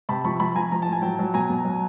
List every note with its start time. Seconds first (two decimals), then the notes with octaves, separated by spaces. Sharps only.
0.09 C3 A5 B5
0.24 F3 B5 C#6
0.40 F3 A5 B5
0.56 F3 G#5 A#5
0.72 F3 A#5
0.82 A2 A5
0.92 G#5
1.02 F#3 G5 A5
1.19 F#3
1.34 B2 G#5 A#5
1.50 B2
1.65 F#3